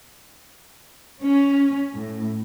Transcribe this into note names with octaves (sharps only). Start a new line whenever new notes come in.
C#4
A2